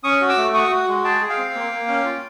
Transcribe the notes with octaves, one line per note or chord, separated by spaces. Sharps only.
C#4 C#6 D#6
F#4
D6 E6
A3
F#4 C#6 D#6
F#4
G#3
G#4 G5 A5
G#4
F5 G5
C4
A#3
A#3
C#4
F4